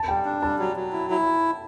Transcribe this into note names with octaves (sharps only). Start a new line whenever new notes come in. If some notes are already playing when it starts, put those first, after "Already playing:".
Already playing: A5
G3 G5
D4
G3 A5
F#3
F#3
E4
E4